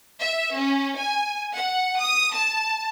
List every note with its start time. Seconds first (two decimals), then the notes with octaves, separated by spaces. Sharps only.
0.20 E5
0.57 C#4
0.98 G#5
1.55 F#5
2.00 D#6
2.34 A5